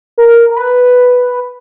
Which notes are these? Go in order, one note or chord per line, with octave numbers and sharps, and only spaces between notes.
A#4
A#4
B4